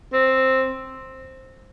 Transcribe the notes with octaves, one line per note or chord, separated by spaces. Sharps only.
C4